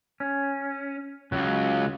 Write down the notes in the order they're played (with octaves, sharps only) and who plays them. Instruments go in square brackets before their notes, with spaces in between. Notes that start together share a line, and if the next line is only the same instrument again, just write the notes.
[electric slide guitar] C#4
[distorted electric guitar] C#2 [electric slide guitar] F#3